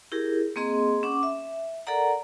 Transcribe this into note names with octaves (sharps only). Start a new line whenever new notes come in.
E4 G4 G#4 A#4
A#3 C4 G#4 D#5 C6
C#4 F#5 D6
E5
A4 A#4 D5 F#5 A#5